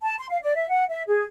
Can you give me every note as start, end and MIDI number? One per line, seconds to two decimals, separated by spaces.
0.01 0.15 81
0.18 0.25 84
0.29 0.38 77
0.42 0.54 74
0.54 0.67 76
0.68 0.83 78
0.89 1.02 76
1.07 1.23 68